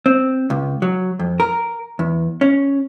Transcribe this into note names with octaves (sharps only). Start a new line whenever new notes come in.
C4
C#2
F#3
F2
A#4
E2
C#4